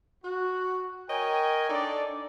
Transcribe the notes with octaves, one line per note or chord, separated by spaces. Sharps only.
F#4
A#4 C#5 D#5 G5 G#5
D4 D#4 A4 D5